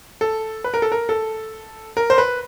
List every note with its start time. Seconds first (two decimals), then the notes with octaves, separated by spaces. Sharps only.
0.21 A4
0.64 B4
0.74 A#4
0.82 A4
0.92 A#4
1.09 A4
1.97 A#4
2.10 C5
2.18 B4